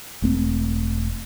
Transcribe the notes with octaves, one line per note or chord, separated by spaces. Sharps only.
E1 A3 C4